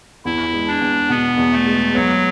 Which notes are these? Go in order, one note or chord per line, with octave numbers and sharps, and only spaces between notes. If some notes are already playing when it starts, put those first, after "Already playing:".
E2 E4
G#3
D4
E2
B2 B3
E2
A3
G#3
F#3 B3